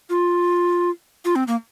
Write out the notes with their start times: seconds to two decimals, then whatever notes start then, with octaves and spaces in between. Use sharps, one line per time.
0.10 F4
1.25 F4
1.36 C4
1.47 A#3